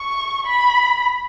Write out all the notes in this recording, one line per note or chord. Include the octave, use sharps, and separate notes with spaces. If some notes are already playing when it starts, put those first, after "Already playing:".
Already playing: C#6
B5